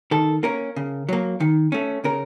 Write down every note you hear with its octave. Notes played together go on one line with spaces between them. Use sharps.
D#3 A4
A#3 C#4 A#4
C#3
F#3 A#3
D#3
A3 C#4
C#3 A#4